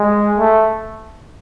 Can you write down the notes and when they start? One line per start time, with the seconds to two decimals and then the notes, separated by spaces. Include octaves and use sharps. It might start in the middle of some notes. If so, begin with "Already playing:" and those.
Already playing: G#3
0.39 A3